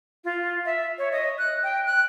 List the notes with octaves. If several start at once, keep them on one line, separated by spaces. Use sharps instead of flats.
F4
E5
C#5
D#5
F#6
G5
F#6